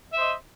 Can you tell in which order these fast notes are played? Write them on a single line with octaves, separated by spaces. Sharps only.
E5 C5 D#5